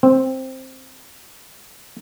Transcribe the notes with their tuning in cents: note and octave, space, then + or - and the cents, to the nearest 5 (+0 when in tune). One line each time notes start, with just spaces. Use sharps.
C4 +5